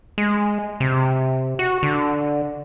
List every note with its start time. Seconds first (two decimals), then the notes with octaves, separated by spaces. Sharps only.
0.18 G#3
0.80 C3
1.59 F#4
1.83 D3